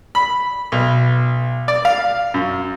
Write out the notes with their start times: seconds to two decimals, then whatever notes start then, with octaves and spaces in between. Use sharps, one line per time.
0.15 B5
0.72 B1
1.68 D5
1.85 F5
2.34 F#2